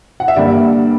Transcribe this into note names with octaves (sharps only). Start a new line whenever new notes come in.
F#5
E5
G2 D3 G3 A#3 D5